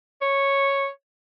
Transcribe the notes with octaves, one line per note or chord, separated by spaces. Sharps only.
C#5